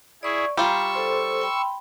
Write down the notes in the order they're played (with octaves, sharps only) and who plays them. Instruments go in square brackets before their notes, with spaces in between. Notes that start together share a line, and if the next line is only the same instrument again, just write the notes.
[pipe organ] E4 G#4 [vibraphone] D5 C#6
[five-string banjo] G3 F4 [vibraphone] A#5 [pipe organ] C#6 E6
[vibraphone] A4 C5 C6
G5 B5 C6